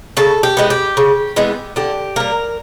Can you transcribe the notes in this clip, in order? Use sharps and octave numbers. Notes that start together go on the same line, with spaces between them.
C#3 A4
G4
E3 G#3 B3
G4
C#3
E3 G#3 B3
D3 G4
G3 A#3 A#4